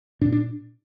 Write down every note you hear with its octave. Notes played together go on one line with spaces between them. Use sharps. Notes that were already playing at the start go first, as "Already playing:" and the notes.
A#2 D4
D4